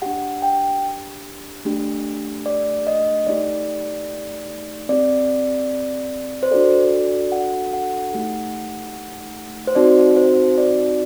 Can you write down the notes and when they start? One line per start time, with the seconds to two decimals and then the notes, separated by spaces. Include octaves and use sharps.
0.02 D4 G4 F#5
0.42 G5
1.65 A3 D4 G4
2.46 D5
2.87 D#5
3.27 A3 D#4 G4 D5
4.89 C4 G4 D5
6.43 C5
6.51 D4 F#4 A4 D5
7.32 F#5
7.73 F#5
8.14 A3 D#4 G4
9.67 C5
9.75 C4 D#4 F#4 D5
10.16 C5
10.58 D5